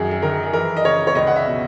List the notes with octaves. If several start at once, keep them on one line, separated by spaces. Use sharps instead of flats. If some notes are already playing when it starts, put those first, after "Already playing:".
Already playing: F#2 D#3 G#4
G#4
D#3 A#4
G#4
E3 A#4
D#5
C#3 C#5
C#5
C#2 D#5
F#5
E5
B2